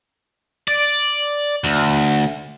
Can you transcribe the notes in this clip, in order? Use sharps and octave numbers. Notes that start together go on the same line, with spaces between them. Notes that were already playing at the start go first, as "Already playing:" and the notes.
D5
D2